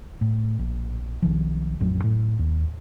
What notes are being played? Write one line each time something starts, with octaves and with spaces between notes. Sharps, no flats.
A2
A#1
B1 D#3 F3
A1 F2 F#3
A2
D#2